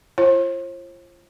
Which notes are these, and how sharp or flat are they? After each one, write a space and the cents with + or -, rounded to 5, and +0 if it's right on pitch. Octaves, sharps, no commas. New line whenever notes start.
F4 -30 C5 +40